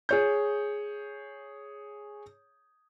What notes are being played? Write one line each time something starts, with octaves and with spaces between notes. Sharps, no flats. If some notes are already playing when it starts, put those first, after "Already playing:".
G#4 C#5 G6